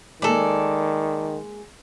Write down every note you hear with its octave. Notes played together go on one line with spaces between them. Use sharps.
D#3 G#3 A#3 A4 D5